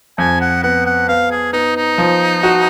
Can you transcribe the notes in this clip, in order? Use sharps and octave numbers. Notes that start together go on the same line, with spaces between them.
F2 G#5
F#5
B3 F#5
F#5
B3 F5
G#4
B3 D#4
D#4
F3
F#4